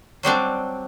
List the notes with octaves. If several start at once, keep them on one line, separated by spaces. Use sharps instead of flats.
F#3 G3 C4 D4